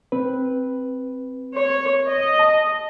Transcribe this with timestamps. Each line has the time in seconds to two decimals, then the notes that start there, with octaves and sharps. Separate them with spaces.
0.12 C4 B4
1.55 C#5
2.08 D#5
2.39 A5